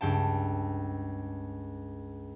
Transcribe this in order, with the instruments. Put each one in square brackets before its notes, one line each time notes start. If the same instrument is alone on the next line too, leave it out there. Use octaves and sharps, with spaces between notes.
[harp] C#2 G2 G5 A5